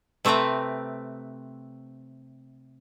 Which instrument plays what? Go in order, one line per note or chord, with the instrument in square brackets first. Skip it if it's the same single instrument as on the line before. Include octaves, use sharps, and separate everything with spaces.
[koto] C3 A3 C4 B4 A#5